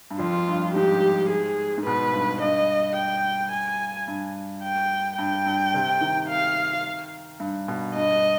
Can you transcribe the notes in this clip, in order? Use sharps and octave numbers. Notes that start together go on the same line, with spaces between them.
G2
F2 F4
G2
G#2 G4
G#4
G#2
B2 B4
G2
G2 D#5
G5
G#5
G2
G5
G2 G5
G2
C3
D#3
F5
G2
B2
G2 D#5